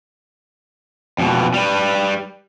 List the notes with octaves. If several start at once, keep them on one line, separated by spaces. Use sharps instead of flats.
F2 B2
G3 B4